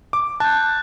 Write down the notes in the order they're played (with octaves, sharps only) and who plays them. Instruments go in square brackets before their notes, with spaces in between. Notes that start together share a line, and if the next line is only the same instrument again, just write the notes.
[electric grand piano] D6
[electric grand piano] A5 [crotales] F#6 G6